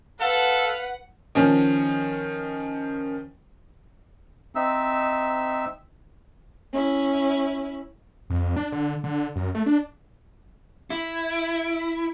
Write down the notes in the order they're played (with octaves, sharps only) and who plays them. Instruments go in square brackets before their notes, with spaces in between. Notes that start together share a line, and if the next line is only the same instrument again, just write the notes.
[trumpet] A4 [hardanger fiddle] B4 [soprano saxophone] F5 [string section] F#5
[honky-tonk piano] D#3 F3 C#4
[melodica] C4 D#4 E5 E6
[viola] C#4 E4
[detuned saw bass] F2
D4
D3
D3
F#2
A3
D4
[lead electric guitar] E4